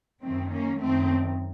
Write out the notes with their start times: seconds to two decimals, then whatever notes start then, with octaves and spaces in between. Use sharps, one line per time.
0.23 F#2 D#3 A3 C4
0.51 A#3 C#4
0.82 F#2 D#3 A3 C4